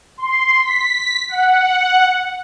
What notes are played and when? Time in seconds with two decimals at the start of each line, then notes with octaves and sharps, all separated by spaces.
0.17 C6
0.62 B6
1.29 F#5